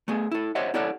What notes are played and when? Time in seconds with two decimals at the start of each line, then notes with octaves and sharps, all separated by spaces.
0.08 A3 B3 G#4
0.31 E4 A4
0.55 G4 C5 C#5 D#5 E5 F#5
0.74 E4 G4 A4 C#5 D5 F#5